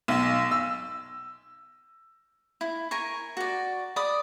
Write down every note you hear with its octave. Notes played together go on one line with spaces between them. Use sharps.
B1
E6
E4
A#4 G#5 C#6
F#4 D5
D5 B5 D#6